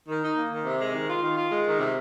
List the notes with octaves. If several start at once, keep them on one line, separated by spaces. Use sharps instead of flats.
D#3
D#4
A#3
D#3
C3
G#3
D#3
F4
D#3
F4
G#3
D#3
C3